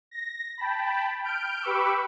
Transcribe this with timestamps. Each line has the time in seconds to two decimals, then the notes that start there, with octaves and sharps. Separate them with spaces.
0.11 A#6
0.58 G5 A5 B5
1.24 F6 G6 D7
1.62 G4 B4 B5 C#6 D6 E6